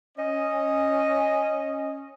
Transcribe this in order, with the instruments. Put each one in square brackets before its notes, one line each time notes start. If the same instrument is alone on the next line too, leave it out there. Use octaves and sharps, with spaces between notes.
[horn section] C#4 D#5